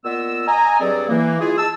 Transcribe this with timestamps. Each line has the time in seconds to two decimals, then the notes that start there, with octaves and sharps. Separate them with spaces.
0.04 A#2 B3 D#5 E6
0.47 D#5 G#5 A#5
0.80 G2 F#3 C4 G#4 A4 D5
1.08 E3 A#3
1.40 G#3 E4 F4 G#4
1.58 A5 E6